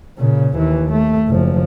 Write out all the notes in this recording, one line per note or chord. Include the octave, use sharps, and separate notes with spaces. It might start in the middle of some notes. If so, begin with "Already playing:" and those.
A#2 C#3
D#2 E3
A3
F#1 F3